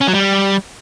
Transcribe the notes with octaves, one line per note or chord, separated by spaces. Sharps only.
C#4
F#3
G3